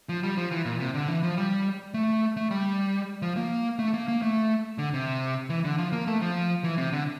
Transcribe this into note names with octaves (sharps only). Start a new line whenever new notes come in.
F3
G3
F3
E3
A#2
C3
D3
E3
F3
G3
A3
A3
G3
F3
A#3
A3
A#3
A#3
A3
D3
C3
E3
D3
F3
A#3
A3
F3
E3
C3
D3